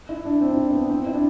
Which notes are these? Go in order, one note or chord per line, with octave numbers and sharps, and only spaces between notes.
E4
D4
C4
E4
D4
B3
C4
C4
E4
D4